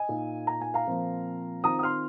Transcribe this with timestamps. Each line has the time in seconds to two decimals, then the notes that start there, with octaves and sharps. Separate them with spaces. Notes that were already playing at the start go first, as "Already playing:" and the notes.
Already playing: D#5 G#5
0.09 A#2 A#3 D#4
0.47 A#5
0.61 G#5
0.74 F5 A#5
0.87 A#2 F3 C4 F4
1.64 D#3 C4 F4 A#5 D#6
1.79 D#6
1.83 C6 F6